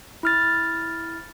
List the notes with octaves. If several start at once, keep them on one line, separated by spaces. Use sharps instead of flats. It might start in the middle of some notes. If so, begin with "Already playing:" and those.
E4 F6 A6